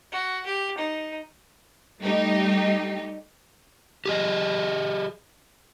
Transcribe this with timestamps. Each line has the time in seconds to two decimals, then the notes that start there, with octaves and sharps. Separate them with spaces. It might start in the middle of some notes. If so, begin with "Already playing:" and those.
0.12 F#4
0.46 G4
0.78 D#4
2.00 G3 A3 D#4 G4
4.06 G4 G#4 D#5